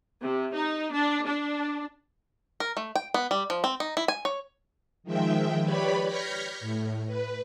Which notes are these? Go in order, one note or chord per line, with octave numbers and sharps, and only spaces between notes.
C3
D#4
D4
D4
A#4
A3
G5
B3
G3
F3
C4
D#4
E4
G#5
C#5
D#3 F3 G#3 E5 G5
G4 B4 C#5 D5 B5
F6 G6 G#6 A#6 B6 C#7
A2
B4